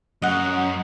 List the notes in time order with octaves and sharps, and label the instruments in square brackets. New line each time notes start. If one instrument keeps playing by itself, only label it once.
[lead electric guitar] F#2 [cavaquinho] D#5 F#5